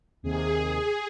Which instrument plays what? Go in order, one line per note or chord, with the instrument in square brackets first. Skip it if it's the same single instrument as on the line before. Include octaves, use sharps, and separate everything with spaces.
[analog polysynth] D#2 C3 D#3 [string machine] G#4